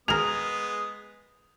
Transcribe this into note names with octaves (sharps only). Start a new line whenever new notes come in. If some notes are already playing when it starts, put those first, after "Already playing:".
G#3 B3 G#4 A#4 D#6 F7